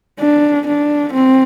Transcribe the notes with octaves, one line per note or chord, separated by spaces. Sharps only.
D4
D4
C4